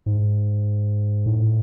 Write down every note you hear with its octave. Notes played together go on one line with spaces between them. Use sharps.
G#2
A2